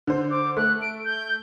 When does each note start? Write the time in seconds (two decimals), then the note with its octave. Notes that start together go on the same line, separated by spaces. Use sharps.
0.07 D3 C5
0.31 D6
0.57 A3 F#6
0.82 D7
1.05 G6